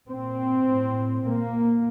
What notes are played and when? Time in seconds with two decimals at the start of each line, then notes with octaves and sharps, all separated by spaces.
0.09 A#2 C4
0.67 A2
1.25 A#2 A#3